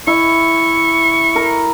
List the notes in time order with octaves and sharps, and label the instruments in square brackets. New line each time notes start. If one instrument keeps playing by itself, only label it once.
[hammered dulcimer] E4 [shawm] C#6
[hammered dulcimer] A#4